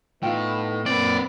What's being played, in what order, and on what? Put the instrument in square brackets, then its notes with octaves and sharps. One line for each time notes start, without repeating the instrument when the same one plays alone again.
[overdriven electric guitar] A2 [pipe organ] B3 D#4 [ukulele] F4 G5
[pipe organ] F#2 A#2 A#3 [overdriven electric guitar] C4 B4 [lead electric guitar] D5